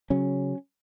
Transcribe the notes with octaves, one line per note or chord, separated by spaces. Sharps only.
C#3 F#3 C#4